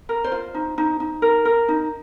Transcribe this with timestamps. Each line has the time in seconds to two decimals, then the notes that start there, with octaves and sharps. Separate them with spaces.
0.09 A#4
0.24 C5
0.32 F4
0.54 D#4
0.78 D#4
1.00 D#4
1.22 A#4
1.45 A#4
1.68 D#4